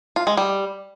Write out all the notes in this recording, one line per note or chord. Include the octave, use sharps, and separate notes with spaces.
F4
G#3
G3